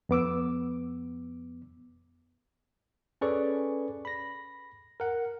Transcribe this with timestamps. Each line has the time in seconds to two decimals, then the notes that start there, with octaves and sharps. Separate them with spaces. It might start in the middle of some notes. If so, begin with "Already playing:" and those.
0.09 F2 B3 D6 E6
3.21 C#4 G#4 A4 B4 D5 C#6
4.05 B5 A#6
5.00 A#4 F#5